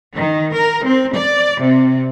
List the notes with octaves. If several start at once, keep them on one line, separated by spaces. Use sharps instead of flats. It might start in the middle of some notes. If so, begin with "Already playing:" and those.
D#3
A#4
C4
D5
C3